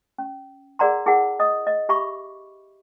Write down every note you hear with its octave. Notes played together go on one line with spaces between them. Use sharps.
C#4
G#4 A#4 D5 F#5 A#5 C6
E4 G#4 A#4 F#5
D#5 D#6
D#5
G4 E5 B5 C#6 D6